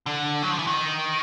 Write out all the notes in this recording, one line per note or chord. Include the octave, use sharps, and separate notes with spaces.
D3
F#3
F3
E3
D#3